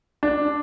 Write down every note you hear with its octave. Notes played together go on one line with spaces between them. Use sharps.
D4